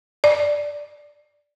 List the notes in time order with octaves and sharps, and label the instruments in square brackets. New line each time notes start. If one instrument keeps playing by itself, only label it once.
[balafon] D5